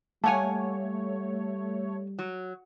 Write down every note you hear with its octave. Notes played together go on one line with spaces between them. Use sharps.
G3 A3 A#3 C#5 F#5 G#5 A5
F#3